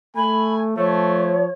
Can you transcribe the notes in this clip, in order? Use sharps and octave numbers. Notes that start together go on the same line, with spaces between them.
A3 G#5 B5
F3 A3 C#5